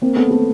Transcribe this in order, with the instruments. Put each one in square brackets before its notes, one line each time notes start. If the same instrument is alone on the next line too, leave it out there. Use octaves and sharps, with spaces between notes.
[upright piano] A#3 C4
A3 B3
A3 B3